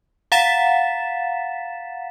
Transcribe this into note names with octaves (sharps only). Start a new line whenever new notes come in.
F5 F#5 A#5 A6 B6 E7